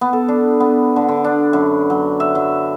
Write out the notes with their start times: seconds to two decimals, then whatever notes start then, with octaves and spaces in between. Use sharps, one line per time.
0.01 B3
0.13 A4
0.29 D4
0.60 B3
0.96 D3
1.08 D3
1.24 D4
1.53 F#2
1.90 F#3
2.20 E5
2.35 F#3